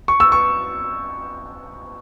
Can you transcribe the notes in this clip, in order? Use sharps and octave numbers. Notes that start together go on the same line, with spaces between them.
C#6
E6
C#6